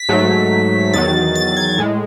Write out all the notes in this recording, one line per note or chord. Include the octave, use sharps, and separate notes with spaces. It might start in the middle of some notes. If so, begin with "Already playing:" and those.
Already playing: B6
G#2 F#3 A3
E2 D#3 F#3 A6
A6
G#6
A2 G#3